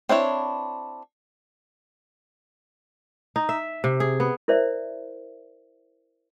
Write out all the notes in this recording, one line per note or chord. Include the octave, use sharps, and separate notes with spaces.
C4 D4 E4 C#5
D#4
E5
C3
G#4
B3
E4 A#4 C5 D5 E5